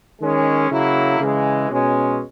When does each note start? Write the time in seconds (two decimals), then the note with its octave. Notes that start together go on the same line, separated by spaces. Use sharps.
0.20 D#3 G#3 C#4
0.70 C#3 F#3 A#3 E4
1.20 C#3 E3 G#3
1.70 B2 G#3 C#4